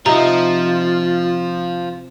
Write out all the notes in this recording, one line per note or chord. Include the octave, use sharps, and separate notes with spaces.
C3 F3 D#4 F4 A#5